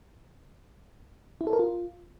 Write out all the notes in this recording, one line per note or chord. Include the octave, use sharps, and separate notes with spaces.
E4
A4
A#4
F4